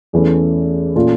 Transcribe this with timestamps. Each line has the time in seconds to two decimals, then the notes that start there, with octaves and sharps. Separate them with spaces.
0.13 E2 E3 A3 C#4
0.95 A#2 A3 C#4 F4